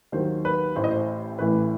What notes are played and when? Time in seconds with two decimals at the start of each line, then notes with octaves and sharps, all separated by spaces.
0.12 D#2 D#3 F#3 C5
0.45 B4
0.76 A1 A2 E3 C5
0.84 D#5
0.91 C5
1.39 A1 A2 E3 B4